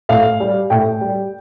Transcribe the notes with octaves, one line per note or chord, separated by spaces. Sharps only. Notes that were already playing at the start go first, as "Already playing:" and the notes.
A2 F5
G3
A2 G5
G3